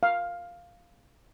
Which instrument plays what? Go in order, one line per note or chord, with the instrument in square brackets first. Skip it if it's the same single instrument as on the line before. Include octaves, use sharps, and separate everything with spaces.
[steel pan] F5